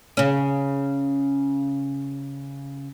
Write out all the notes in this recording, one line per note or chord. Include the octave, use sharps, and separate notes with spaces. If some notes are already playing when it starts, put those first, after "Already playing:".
C#3 C#4